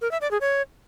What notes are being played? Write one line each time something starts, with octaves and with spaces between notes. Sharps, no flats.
A#4
E5
D5
G#4
C#5